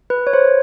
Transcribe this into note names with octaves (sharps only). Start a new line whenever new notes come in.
B4
C#5
C5